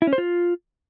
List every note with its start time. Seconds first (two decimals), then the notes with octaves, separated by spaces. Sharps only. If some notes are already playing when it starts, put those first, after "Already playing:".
0.02 E4
0.07 C#4
0.13 C5
0.18 F4